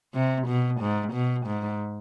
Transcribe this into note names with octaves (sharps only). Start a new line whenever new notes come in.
C3
B2
G#2
B2
G#2